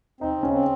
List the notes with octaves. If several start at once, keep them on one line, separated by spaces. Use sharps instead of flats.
C4 D#4
C#3
C#4
C4